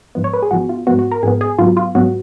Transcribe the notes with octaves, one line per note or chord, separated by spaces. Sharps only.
G#2 F3 B3
C#5
B4
G#4
G#2 F3 B3 F#4
F4
G#2 F3 B3 F#4
F#4
A#4
G#2 F3 B3 G#4
G#4
G#2 F#3 B3 F4
F4
G#2 F#3 B3 F#4